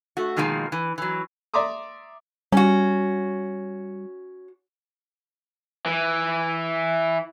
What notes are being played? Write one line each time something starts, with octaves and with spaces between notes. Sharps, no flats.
A3 F#4
B2 D#3 F3 G#3 A#3
E3
E3 F#3
D5 E5 A#5 C6 D6 D#6
G3 C#4 F#4
E3